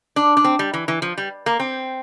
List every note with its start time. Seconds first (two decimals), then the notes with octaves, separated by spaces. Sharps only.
0.16 D4
0.37 D4
0.44 C4
0.59 G3
0.74 E3
0.88 E3
1.02 F3
1.18 G3
1.46 A#3
1.59 C4